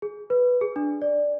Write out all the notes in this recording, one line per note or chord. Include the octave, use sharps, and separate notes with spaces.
G#4
B4
G#4
D4
D5